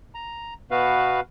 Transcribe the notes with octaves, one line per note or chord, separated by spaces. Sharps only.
A#5
B2 B3 F#4 B4 F5